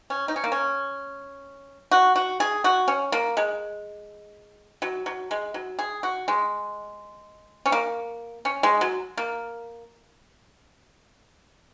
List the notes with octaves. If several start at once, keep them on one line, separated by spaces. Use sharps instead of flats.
C#4
D#4
C#4
A#3
C#4
F#4
F#4
G#4
F#4
C#4
A#3
G#3
F#3
F#3
G#3
F#3
G#4
F#4
G#3
C#4
A#3
C#4
G#3
F#3
A#3